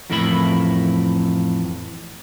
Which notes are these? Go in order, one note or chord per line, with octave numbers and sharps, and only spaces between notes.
F2 A2 E3 A#4 E5 B5